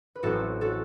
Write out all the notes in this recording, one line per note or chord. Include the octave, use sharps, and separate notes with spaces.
B4
A1 A2 F#3 C4 F#4 A4
F#4 A4